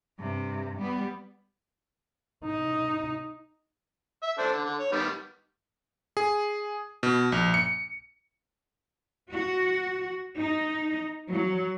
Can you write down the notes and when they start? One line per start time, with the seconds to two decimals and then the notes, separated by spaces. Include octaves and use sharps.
0.19 G2 C3
0.78 G3 B3
2.45 D#4
4.23 E5
4.39 D4 A4 C5
4.53 D3
4.65 D3
4.80 C#5
4.92 D#3 G3 B3
6.17 G#4
7.03 B2
7.32 A#1
7.54 C#7
9.31 F#4
10.38 D#4
11.30 F#3